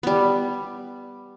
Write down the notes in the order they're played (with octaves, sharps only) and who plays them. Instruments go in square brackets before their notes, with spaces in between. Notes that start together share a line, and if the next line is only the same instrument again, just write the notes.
[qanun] G3 B3